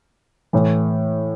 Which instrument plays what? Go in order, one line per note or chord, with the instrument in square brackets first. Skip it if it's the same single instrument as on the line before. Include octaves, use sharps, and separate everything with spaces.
[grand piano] A2 E3